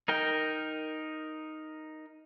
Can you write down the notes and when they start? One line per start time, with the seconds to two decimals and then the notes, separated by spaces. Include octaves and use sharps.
0.08 D#4 A#4 G5